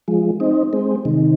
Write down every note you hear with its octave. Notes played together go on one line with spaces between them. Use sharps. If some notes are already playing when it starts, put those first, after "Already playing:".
F3 G#3
C4 D#4
G#3 C4
C3 D#3